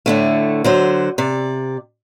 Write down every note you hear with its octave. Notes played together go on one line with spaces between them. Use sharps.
A2 D3 A3
D3 F#3 C5
C3 D5